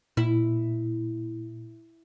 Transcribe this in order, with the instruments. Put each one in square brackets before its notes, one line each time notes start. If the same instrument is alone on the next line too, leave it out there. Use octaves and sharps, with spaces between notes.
[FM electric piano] A#2 [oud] E4